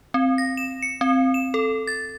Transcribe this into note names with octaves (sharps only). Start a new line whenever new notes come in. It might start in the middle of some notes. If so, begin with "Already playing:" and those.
C4
A#6
E7
C#7
C4
E7
A4
A6